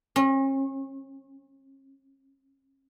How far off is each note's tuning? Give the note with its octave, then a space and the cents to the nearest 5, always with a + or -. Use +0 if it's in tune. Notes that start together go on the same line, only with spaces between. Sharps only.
C#4 -40